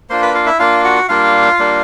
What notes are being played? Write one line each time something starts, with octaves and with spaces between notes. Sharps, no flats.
A#3 D4 F4 C5 C6
B4 B5
F4 F5
E4 E5
A#3 D4 F4 F5
F#4 F#5
G3 A#3 D4 F4 F5
G3 A#3 D4